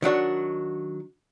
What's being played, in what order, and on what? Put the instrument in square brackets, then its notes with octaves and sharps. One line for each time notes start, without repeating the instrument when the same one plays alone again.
[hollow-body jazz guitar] D#3 F#3 D4 F#4